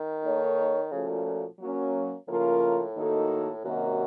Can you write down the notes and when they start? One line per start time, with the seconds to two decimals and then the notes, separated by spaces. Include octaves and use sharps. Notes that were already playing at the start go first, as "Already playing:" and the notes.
Already playing: D#3
0.24 A#3 D#4 A4 C#5
0.92 C#3 F3 A3 C#4 F#4 A4
1.09 A#2
1.26 A#2
1.60 F#3 A#3 C#4
2.27 A2 C#3 F3 A#3 F4 A#4
2.96 D#3 A#3 D#4 F#4 A4
3.64 F#2 C3 D#3 A#3 D#4 F#4